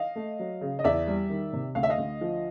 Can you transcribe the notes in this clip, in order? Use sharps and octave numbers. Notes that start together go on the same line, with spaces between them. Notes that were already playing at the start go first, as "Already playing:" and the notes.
Already playing: D#5 F5
A3
F#3
C#3
D#5
E2 D5 E5
G3
D#3
C3
D2 F5
E5
D#5 F5
D2
F3